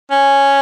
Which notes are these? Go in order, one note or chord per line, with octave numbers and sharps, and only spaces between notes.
C#4